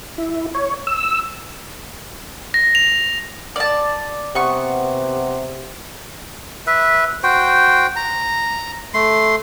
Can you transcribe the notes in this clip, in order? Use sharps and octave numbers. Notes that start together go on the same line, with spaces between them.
E4
C#5
E6
A#6
F7
D5 A5
C3 B3 C#6
B4 E5
F#4 C5 G5
A#5
A3 C6